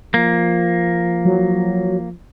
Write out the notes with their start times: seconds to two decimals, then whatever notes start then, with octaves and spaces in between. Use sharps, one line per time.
0.14 F3 A#3
1.25 F#3